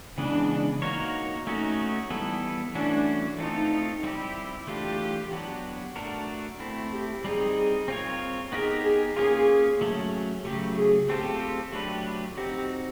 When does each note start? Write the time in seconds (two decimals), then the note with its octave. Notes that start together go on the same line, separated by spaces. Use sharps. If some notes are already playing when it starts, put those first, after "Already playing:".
0.18 C#3 E3 G#3 B3 D4
0.82 A#3 D#4 F#4 A#4 C#5
1.46 A3 C#4 D#4 F#4
2.10 E3 G3 B3 E4 A4
2.75 E3 A3 C#4 D4 F#4
3.39 A3 C4 D#4 F4 A4
4.03 G3 C4 E4 G4
4.67 E3 A3 D4 F4 G4
5.31 F#3 B3 D4 F#4
5.96 A3 D4 F#4 A#4
6.60 A3 C4 E4
6.92 G4
7.24 G3 C4 D#4 G#4
7.88 C4 F4 A#4 C#5
8.52 B3 D#4 G4 G#4 A#4
8.84 G#4
9.16 A#3 C#4 F4 G#4
9.81 F#3 A3 C#4
10.44 C#3 F#3 A3 G4
10.77 G#4
11.09 A3 C4 F4 G4 A4 C5
11.73 F#3 A3 D4 G4 B4
12.37 C4 D#4 F#4 G4